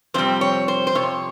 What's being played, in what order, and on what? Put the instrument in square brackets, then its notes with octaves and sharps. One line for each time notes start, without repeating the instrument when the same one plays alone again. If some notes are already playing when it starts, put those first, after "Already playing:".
[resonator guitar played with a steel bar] F2 C3 G3 C4 C5
C#5
C5
C5
F2 C3 C#5